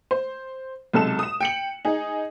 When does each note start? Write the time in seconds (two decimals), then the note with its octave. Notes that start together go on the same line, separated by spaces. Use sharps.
0.11 C5
0.94 B1 C3 G#3 A4 A5 E7
1.19 D#6 E7
1.41 G5 C#7 F#7
1.85 D#4 G#4